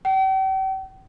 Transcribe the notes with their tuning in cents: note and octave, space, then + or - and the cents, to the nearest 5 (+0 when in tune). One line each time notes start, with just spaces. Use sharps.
G5 -40